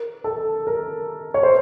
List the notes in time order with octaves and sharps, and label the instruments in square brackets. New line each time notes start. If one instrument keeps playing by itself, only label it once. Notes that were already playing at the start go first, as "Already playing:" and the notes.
Already playing: [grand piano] A#4
A4
A#4
C#5
C5